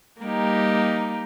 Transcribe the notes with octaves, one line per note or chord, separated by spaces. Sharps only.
G3 A#3 D#4 G4